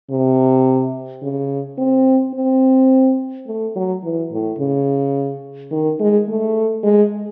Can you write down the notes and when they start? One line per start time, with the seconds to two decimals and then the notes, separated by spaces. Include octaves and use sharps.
0.10 C3
1.22 C#3
1.78 C4
2.34 C4
3.47 A3
3.75 F#3
4.04 E3
4.32 A2
4.58 C#3
5.71 D#3
6.00 G#3
6.28 A3
6.83 G#3